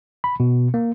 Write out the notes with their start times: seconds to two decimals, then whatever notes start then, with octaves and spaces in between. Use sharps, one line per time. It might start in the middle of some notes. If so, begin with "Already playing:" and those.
0.24 B5
0.40 B2
0.74 A#3